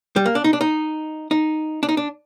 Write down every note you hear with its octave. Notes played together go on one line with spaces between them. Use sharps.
G3
A#3
D4
D#4
D4
D#4
D#4
D4
D#4
D4